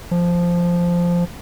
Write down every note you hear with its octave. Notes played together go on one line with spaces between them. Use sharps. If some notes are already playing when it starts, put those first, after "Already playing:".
F3